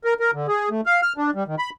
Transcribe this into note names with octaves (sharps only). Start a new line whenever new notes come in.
A#4
A#4
D3
G#4
A3
F5
F6
D4
G3
D#3
B5